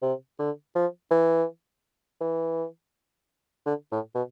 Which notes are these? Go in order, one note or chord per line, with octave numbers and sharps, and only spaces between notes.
C3
D3
F3
E3
E3
D3
A2
B2